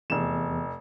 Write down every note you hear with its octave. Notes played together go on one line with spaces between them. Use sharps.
F1 E2 E7